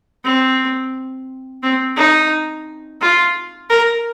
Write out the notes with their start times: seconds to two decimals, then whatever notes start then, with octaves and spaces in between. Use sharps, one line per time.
0.24 C4
1.63 C4
1.97 D#4
3.01 F4
3.70 A#4